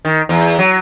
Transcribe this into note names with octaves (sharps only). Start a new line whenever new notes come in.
D#3
E2
F#3